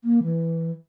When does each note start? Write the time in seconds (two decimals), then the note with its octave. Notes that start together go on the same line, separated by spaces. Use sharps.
0.04 A#3
0.23 E3